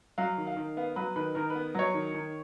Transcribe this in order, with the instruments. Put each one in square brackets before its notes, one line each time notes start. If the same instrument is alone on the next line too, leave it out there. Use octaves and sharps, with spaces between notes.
[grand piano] F#3 F5
D#3
F5
D#3
B3 F5
F#3 B4
D#3 B4
D#3 A#4
B4
B3
F#3 C#5
D#3
D#3